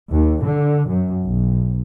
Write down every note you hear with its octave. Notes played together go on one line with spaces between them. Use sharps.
D#2
D3
F#2
B1